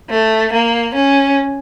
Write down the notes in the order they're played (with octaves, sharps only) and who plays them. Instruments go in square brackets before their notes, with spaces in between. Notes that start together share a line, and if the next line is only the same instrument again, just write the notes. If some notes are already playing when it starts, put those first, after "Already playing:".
[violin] A3
A#3
C#4